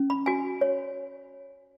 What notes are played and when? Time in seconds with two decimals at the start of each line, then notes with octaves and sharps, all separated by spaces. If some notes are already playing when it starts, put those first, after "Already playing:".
Already playing: C#4
0.10 B5
0.26 F#4 G#5
0.61 C#5